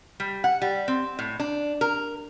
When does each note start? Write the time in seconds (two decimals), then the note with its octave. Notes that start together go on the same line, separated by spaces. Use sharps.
0.20 G3
0.44 F#5
0.62 G3
0.88 C4
1.19 A2
1.40 D4
1.81 A#4